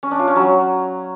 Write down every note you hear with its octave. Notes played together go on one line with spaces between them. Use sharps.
C#4
D4
F4
C#4
F#3